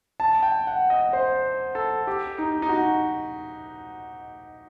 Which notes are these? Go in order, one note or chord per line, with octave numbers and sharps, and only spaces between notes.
A5
G5
F#5
D#5
C5
A4
G4
D#4
D#4
F#4